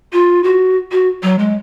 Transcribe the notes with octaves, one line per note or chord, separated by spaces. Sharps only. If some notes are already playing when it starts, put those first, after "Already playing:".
F4
F#4
F#4
F#3
G#3